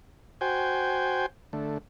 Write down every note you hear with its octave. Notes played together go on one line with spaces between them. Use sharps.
F#4 C5 G5 G#5
D3 A3